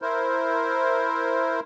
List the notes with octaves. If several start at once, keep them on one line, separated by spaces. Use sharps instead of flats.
E4 A#4 C5